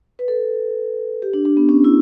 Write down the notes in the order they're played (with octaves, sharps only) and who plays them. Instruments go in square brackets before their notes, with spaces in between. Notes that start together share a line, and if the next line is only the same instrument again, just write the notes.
[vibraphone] B4
A4
G4
D4
D4
B3
C#4
E4